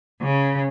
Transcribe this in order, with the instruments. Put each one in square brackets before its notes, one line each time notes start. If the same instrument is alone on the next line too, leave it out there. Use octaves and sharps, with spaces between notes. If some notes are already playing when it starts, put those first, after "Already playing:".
[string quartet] C#3